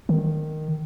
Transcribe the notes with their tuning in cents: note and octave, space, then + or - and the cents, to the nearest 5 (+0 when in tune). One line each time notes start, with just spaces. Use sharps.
D#3 -10